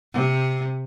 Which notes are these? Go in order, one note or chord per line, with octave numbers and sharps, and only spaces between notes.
C3